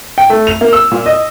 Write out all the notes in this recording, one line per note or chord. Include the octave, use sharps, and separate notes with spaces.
G5
A3
F7
A#3
E6
A#2
D#5